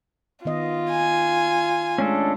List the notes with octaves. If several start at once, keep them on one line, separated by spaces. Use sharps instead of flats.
D#3 B3 F4 D#5
G#5
G#3 A3 C#4 D4 A4